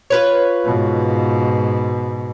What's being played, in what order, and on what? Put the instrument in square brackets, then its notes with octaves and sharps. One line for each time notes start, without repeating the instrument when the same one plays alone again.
[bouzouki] F4 B4 C#5
[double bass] G#2 B2